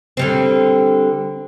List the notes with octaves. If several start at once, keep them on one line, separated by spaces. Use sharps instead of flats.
D3 G3 C4